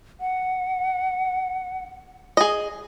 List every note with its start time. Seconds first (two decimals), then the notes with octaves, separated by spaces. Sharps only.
0.20 F#5
2.37 G#4 D#5